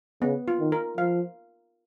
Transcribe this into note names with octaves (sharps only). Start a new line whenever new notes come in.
C#3 B3
F4
D#3
A#4
F3 F5